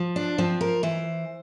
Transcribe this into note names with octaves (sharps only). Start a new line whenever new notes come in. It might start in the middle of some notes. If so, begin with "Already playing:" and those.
Already playing: F3
D4
F3 C4
A#4
E3 C5